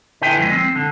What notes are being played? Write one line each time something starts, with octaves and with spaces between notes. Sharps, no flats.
D3 E4 B4 G5 G#5 C6
F3 F#3 G#3
C4
D3